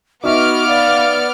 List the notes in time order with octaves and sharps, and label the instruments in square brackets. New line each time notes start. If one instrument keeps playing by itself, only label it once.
[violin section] B3 D6 F6 [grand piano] D#4 E5 [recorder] F#4
[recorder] D5 [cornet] F5